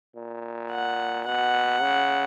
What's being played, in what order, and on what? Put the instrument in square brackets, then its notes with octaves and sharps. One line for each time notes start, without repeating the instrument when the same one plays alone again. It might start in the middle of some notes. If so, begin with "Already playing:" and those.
[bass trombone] A#2
[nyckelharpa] F#5
[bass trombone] B2 [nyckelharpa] F#5
[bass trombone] C#3